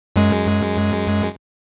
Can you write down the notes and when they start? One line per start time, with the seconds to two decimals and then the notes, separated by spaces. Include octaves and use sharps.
0.16 F#2 G#3